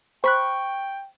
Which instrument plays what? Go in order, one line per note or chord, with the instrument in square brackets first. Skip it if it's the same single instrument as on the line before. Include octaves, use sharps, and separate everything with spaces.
[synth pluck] C5 B5 F#6 [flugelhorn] G5 [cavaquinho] C#6